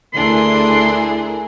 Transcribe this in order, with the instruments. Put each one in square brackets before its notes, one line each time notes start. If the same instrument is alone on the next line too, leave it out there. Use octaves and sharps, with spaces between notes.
[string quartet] D2 D3 D4 [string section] E4 G#4 A#4 [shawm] C6